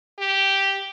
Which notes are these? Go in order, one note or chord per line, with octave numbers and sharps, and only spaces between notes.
G4